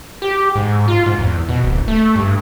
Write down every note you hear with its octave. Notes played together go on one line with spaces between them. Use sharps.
G4
G#2
F4
G#2
E2
B2
D1
A3
G2